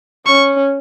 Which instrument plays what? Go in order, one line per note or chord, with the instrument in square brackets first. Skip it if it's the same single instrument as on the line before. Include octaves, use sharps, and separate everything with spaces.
[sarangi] C#4 [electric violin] C#6